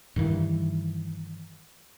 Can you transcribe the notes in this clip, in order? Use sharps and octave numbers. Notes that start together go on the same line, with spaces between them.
G2 D#3 E3